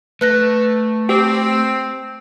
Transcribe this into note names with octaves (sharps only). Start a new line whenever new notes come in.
A3 B4 F#6 A#6
C4 G4